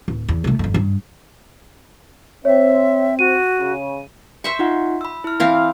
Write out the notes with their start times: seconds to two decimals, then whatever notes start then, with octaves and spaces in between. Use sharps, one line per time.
0.08 D1
0.28 E2
0.44 C2 A3
0.59 G1 F2
0.74 G2
2.45 C4 C#5 E5
3.19 F#4 D#7
3.58 C#3
4.44 C5 E5 C#6
4.59 D#4 F4 F#5
5.01 B5 E6
5.24 E4 F6
5.40 E3 C4 F5